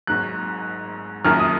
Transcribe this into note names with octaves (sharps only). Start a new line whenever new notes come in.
G#1 G#2 F#3 F#6
F#1 F#2 D#3 F#3 F6
D#6